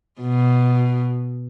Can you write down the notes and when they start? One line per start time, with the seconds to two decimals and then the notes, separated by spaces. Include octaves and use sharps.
0.21 B2